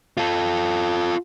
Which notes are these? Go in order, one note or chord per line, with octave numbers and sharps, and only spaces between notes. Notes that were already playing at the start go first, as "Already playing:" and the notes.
F4 A4